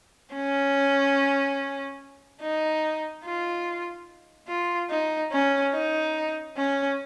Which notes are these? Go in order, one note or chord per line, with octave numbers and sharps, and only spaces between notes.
C#4
D#4
F4
F4
D#4
C#4
D#4
C#4